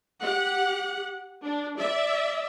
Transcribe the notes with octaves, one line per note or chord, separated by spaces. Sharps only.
G4 F#5
D4
D5 E5